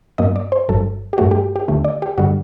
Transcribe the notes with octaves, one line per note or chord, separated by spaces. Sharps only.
G2 F#3 A#3 D#5
D5
C5
G1 G2 F#3 A4
G4
G2 F#3 A3 F#4
G4
G4
D#2 D3 A3
D5
G4
G2 D3 G3 F#4